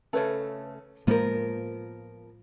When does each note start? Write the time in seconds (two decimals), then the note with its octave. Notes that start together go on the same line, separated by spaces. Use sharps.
0.13 C#3 A3 A4 B4 C#5
1.07 A2 F3 G#3 A#3 B3 F4 A#4 C5